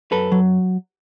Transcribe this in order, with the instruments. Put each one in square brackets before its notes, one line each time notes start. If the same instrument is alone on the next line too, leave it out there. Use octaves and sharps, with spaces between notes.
[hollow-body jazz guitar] F#2 A4 B4
F#3